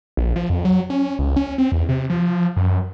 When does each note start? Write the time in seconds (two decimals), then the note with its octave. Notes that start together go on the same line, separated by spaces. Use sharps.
0.17 A#1
0.36 F3
0.50 F2
0.65 F#3
0.90 C#4
1.19 C#2
1.36 C#4
1.58 C4
1.72 E2
1.89 C3
2.10 F3
2.57 F#2